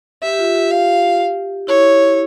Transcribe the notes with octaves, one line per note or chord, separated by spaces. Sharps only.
G4 E5
G4
F4
G4
F5
E4 C#5